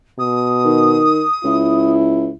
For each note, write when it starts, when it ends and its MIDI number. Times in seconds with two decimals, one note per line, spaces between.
0.19 1.02 47
0.19 1.89 87
0.64 1.22 51
1.44 2.30 37
1.44 2.33 64